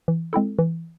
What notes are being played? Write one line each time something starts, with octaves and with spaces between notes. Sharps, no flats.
E3
G#3 C4 E4 A4
E3